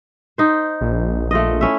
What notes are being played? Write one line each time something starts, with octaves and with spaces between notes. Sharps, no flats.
D#4 C5
A#1
A3 F4 D#5
C#4 E4 E5